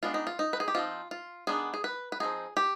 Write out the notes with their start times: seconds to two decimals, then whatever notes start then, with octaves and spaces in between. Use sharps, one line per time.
0.03 G#3 B3 D4 F4
0.14 D#4
0.27 F4
0.39 D#4
0.53 B4
0.60 G#4
0.68 G4
0.75 F3 C4 D#4 F4
1.11 F4
1.47 D#3 B3 D4 G#4
1.74 G#4
1.84 B4
2.12 B4
2.20 F3 C4 D#4 G#4
2.57 G4